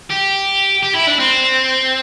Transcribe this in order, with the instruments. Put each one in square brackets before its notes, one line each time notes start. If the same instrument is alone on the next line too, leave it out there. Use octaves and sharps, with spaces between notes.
[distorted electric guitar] G4
G4
E4
D4
C4